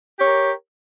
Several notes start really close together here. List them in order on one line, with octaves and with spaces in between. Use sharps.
G4 C#5 A#4